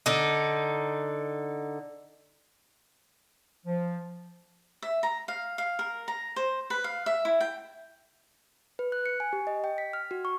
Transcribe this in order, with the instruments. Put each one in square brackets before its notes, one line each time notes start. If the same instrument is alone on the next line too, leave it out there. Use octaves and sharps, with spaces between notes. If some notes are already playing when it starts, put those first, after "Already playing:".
[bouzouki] D3 D#4
[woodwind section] F3
[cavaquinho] E5
A#5
F5
F5
A#4
A#5
C5
B4
F5
E5
E4
G5
[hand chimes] B4
F#6
C#7
G#5
G4
D#5
G5
B6
F6
F#4
C#6